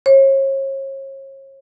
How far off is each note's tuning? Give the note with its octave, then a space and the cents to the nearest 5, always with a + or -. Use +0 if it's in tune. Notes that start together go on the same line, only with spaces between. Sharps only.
C#5 -40